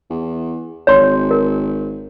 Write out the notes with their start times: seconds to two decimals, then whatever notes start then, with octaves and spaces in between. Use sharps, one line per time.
0.10 E2
0.87 G#1 C#5 C6
1.31 A#4